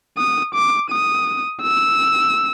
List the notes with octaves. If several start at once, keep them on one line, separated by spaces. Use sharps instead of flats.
D#6
D6
D#6
E6